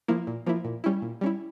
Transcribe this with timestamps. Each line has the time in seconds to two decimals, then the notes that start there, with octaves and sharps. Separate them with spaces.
0.08 F3 A#3 E4
0.27 A#2
0.46 F3 A#3 E4
0.65 A#2
0.84 G3 C#4 E4
1.02 A#2
1.21 G3 C#4 E4